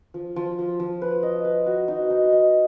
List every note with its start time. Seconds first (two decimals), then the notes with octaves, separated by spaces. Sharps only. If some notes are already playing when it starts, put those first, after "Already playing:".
0.14 F3
0.36 F3
0.59 F3
0.80 F3
1.02 B4
1.23 D#5
1.44 B4
1.66 F#4
1.88 D#4
2.10 D#4
2.32 D#5